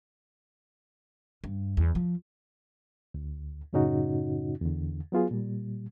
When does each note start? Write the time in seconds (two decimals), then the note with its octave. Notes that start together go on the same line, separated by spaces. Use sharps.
1.44 G2
1.77 E2
1.95 F3
3.14 D2
3.73 F#2 A2 C#3 C#4 D#4 F#4
4.61 E2 D3
5.12 F#3 B3 F4 G#4
5.31 A#2 G3